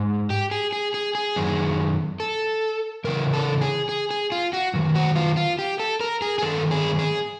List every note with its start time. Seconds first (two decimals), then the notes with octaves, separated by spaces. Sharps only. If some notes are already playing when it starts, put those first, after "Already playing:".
Already playing: G#2
0.30 G4
0.51 G#4
0.73 G#4
0.94 G#4
1.15 G#4
1.36 F#2 D#3
2.20 A4
3.04 E2 C#3 E3 A#4
3.34 A4
3.61 G#4
3.89 G#4
4.11 G#4
4.32 F4
4.53 F#4
4.74 F#2 D#3
4.95 F#4
5.16 F4
5.37 F4
5.59 G4
5.80 A4
6.00 A#4
6.22 G#4
6.39 G#4
6.42 G2 D#3 A4
6.71 G#4
6.99 G#4